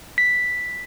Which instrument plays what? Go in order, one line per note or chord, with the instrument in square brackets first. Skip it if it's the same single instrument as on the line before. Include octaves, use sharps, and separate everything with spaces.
[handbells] B6